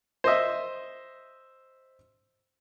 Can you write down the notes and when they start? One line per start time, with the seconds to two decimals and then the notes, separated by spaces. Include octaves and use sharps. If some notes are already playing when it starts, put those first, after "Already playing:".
0.24 C5 D#5 E5